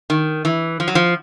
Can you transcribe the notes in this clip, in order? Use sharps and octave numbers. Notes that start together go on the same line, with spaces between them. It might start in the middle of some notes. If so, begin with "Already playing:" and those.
D#3
E3
F3
F#3
F3